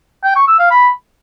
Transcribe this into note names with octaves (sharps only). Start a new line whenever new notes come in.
G5
C#6
E6
F5
B5